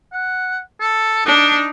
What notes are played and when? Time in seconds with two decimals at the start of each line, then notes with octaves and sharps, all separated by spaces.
0.13 F#5
0.81 A4
1.26 D4 D#4